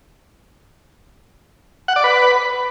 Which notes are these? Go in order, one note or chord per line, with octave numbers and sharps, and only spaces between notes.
F#5
D5
B4